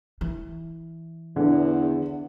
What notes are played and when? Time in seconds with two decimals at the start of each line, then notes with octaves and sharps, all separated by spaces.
0.21 E3
1.36 E2 D3